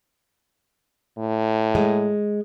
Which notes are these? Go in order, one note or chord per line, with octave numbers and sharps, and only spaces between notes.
A2
G#3